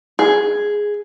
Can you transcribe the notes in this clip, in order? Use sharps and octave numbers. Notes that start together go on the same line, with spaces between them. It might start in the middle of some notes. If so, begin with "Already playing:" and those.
G#4